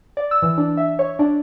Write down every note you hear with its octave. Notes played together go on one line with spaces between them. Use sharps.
D5
E6
E3
D4
E5
C#5
D4